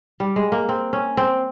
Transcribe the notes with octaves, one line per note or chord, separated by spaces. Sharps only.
G3
G#3
A#3
C4
C#4
C4